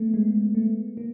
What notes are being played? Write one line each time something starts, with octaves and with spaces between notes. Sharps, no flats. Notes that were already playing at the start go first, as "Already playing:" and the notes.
Already playing: A3 B3
G#3
A3
A#3